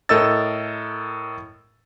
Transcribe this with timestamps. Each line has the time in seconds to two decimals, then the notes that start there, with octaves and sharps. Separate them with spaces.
0.09 A2 A4 A#4 D#5 E6 A6